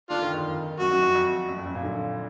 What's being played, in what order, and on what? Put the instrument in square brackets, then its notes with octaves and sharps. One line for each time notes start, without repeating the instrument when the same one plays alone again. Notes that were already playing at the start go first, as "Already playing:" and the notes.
[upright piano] D3 [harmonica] D4 F4
[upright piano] D#3
D#3
F2
[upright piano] F#2 [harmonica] F#4
[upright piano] F#2
F2
F2
F#2
F2
F#2
A#2
D3